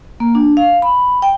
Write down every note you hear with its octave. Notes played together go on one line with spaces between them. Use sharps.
A#3
D4
F5
B5
G5